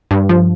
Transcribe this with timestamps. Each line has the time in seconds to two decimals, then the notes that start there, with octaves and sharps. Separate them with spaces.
0.11 G2
0.29 F3